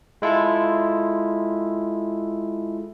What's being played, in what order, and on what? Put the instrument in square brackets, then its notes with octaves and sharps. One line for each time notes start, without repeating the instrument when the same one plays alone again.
[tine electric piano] G#3 E4 F4 A4